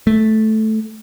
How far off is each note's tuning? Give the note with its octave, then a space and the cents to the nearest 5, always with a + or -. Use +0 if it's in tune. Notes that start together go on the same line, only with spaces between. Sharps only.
A3 -10